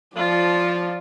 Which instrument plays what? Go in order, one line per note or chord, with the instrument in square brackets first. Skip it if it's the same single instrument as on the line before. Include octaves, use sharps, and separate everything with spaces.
[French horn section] F3 [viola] F4 [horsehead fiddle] D5